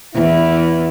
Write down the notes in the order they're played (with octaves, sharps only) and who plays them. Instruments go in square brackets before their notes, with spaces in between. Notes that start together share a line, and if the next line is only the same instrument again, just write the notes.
[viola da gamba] E2 [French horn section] E4